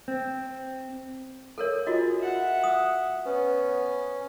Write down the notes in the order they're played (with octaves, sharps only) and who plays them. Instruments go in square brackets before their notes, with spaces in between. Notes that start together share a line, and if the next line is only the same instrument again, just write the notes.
[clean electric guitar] C4
[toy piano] A4 A#4 C#5
[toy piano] F4 F#4 D#5 [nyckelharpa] G#4
[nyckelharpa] E5 F#5
[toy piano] D#6
[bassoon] B3 [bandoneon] C#4